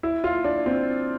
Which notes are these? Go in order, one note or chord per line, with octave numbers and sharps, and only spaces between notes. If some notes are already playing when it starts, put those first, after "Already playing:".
E4
F4
D4
C4